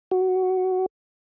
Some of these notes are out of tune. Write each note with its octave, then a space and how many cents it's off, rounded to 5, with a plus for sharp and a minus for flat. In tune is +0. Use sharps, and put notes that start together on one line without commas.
F#4 +10